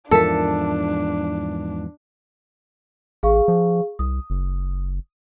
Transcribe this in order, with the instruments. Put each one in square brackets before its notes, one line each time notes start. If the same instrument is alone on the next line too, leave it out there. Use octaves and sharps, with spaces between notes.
[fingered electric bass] E2 G#2 F3 [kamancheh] D4 [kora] A4 E5 [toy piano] A#4
[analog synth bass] A1 [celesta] G#4 F5 C#6
[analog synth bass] F3
[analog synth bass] C2 [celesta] D#6
[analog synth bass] F#1